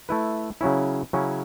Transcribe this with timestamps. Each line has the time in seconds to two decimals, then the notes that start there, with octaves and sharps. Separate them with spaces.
0.09 A3 E4 B4
0.61 C#3 F#3 C#4 E4
1.13 C#3 F#3 C#4 E4